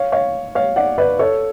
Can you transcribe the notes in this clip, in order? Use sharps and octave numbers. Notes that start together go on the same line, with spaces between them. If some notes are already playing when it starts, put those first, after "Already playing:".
Already playing: C#5 F5
C#5 F5
C#5 F5
D5 F#5
B4 D5
A4 C#5